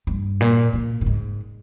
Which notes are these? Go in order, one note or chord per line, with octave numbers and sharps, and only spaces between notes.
G2
A#2
A#2
A#2
G#2